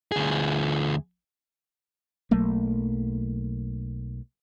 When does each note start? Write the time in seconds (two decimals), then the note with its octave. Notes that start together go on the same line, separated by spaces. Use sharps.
0.12 D2 G#4
2.31 B1 F#3 A3 A#3